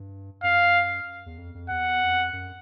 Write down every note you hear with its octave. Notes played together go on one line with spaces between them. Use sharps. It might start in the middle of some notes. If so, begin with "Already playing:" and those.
Already playing: G2
F#2 F5
E2
F2
F2
E2 F#5
F2
F#2